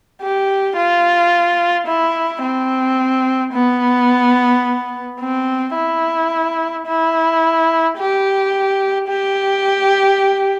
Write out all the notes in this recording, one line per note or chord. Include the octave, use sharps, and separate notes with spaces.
G4
F4
E4
C4
B3
C4
E4
E4
G4
G4